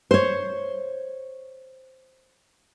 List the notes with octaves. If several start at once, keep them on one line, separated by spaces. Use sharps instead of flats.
C5 C#5